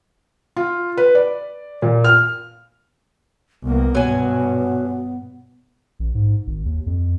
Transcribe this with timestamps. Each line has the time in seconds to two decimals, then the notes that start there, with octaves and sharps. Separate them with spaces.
0.57 F4
0.97 B4
1.15 D5
1.82 A#2
2.04 F6
3.64 C2 A#3 B3
3.95 G2 B2 F#3 G#5
5.99 A1
6.15 G#2
6.47 G#1
6.66 D#2
6.86 F2